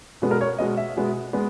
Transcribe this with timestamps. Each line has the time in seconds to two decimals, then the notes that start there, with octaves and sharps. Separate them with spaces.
0.22 B2 G#3 B3
0.31 A#4
0.41 C#5
0.58 B2 G#3 B3 D#5
0.77 E5
0.96 B2 G#3 B3
1.33 G#3 B3